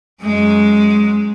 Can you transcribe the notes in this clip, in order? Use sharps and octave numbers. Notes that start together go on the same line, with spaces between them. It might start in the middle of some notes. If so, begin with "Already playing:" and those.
F#2 G#3